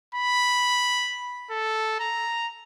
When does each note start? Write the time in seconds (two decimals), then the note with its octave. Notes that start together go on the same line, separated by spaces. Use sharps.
0.14 B5
1.50 A4
2.00 A#5